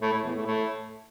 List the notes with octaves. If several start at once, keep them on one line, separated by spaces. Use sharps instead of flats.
A2
A2
E2
A2
A2